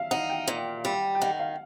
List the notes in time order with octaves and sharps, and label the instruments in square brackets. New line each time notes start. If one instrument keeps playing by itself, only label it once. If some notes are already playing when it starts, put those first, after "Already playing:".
Already playing: [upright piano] E5 F5
[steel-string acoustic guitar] D#4 [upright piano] F#5
[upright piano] G5
[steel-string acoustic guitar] A#2
G3
[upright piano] G5
[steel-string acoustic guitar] D#3 [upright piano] F#5
[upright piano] F5